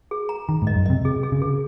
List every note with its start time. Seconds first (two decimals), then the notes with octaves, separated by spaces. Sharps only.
0.11 G#4
0.29 A#5
0.49 D#3 A#5
0.62 G#2
0.67 D#5
0.76 F#2
0.86 C3 D#5
1.05 C3 G#4
1.23 G#4
1.32 C#3
1.42 G#4